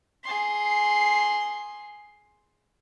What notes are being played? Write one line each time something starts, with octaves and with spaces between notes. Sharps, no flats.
G#4 C6